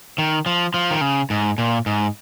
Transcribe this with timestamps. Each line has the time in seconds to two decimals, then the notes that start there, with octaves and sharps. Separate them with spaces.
0.18 D#3
0.46 F3
0.74 F3
0.91 D#3
1.01 C#3
1.30 G#2
1.58 A#2
1.86 G#2